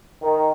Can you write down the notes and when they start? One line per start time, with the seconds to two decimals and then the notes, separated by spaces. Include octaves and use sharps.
0.23 D#3